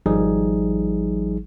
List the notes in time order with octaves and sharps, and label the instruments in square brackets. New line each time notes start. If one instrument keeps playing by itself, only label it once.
[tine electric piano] G#1 F3 G3 D#4 G#4